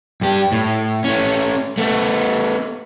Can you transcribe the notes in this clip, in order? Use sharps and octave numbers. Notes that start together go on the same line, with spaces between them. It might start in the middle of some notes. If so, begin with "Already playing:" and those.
G2 G4
A2
A3 C#4
A3 B3